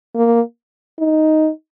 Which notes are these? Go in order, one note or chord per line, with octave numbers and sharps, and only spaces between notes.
A#3
D#4